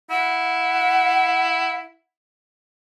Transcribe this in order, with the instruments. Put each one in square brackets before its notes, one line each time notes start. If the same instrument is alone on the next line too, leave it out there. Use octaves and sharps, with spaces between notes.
[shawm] E4 [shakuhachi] F#5